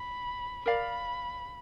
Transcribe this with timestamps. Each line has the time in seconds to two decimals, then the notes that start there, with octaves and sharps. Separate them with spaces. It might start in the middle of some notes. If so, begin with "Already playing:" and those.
Already playing: B5
0.66 A#4 D5 F5 B5